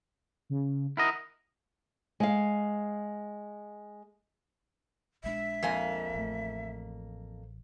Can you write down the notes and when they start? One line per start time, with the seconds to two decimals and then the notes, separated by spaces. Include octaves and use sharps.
0.50 C#3
0.97 E4 A#4 D#5 F#5
2.20 G#3 F5
5.24 A#1 G#3 D4 E5
5.63 F2 A#3 G#5
6.14 A1 A3